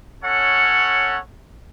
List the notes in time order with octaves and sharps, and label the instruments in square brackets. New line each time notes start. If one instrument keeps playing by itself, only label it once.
[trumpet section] C#4 A4 C#5 F#5